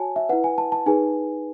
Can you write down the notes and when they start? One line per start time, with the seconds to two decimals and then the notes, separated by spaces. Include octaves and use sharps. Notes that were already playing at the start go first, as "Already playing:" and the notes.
Already playing: F#4 C#5 G#5 A5
0.16 E5
0.29 B4 F#5
0.33 E4
0.44 G#5
0.58 A5
0.72 A5
0.86 D#4 G#4 B4 G#5